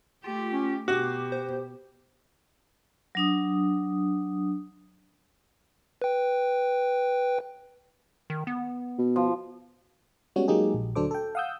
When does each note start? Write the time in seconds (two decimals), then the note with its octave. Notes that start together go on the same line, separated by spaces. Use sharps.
0.24 A3 F4 G4
0.53 C#4
0.88 B2 F#4 G4 D6
1.32 C5
3.15 F#3 D4 D#6
6.02 B4 G5
8.30 D#3
8.47 B3
8.98 B2
9.16 F3
10.36 G3 G#3 B3 C#4 F#4 C#5
10.48 F#3 G#3 A#3 D#4 G4 G#4
10.74 A#1
10.95 D2 F#3 D4 A4 C5 D6
11.11 A4 G5
11.35 F5 F#5 D#6 E6 G6